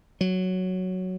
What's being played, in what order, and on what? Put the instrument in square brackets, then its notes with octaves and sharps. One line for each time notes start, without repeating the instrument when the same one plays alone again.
[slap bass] F#3